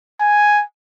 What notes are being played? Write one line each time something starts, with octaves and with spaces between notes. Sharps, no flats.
G#5